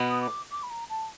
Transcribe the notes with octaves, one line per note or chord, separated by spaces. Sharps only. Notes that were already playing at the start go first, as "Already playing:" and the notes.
Already playing: B2 B3
D#6
D6
D6
B5
A#5
A5